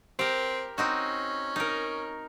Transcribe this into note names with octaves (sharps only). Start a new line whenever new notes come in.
C4 G4 A#4
C4 C#4 D#4 F#4
D#4 A#4